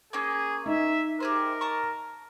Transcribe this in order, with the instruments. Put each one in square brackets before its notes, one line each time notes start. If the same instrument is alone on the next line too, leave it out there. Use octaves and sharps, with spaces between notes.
[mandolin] A#3 C#4 [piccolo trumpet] G#4
[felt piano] D#4 [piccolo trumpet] E5
[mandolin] G4 G#4 C5 [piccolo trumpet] A#4
[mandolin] A5 A#5 C#6